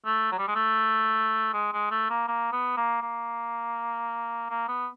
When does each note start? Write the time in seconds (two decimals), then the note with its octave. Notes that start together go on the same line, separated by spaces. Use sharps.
0.05 A3
0.32 F#3
0.39 G3
0.48 G#3
0.55 A3
1.53 G#3
1.73 G#3
1.91 A3
2.10 A#3
2.28 A#3
2.53 B3
2.77 A#3
3.02 A#3
4.50 A#3
4.68 B3